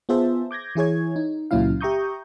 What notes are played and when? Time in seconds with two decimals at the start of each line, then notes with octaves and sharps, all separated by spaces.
0.09 B3 F4 G#4 C5 E5 A5
0.51 D6 G6 G#6 A#6
0.75 E3 E4 G#4 C#5 G#6
1.16 D#4
1.51 C#2 A#2 F#3 C#4 E4 F5
1.81 G4 E5 A#5 C#6 D#6 G6